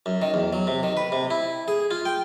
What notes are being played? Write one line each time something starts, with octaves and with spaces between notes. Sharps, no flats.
F#2
D#3
E2
F#3
C3
D#3
B4
C3
E4
G#4
F4
G5